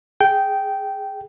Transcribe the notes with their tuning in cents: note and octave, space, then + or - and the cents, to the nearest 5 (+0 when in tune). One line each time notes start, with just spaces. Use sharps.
G#4 +0 G5 -10